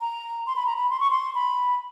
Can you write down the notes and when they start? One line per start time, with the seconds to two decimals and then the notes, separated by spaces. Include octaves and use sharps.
0.01 A#5
0.47 C6
0.56 B5
0.66 A#5
0.76 B5
0.90 C6
1.00 C#6
1.10 C6
1.35 B5